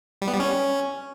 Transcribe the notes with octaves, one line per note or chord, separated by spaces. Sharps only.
G3
B3
G3
C#4